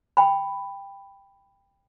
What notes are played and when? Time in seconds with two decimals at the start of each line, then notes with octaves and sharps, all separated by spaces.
0.17 G5 B5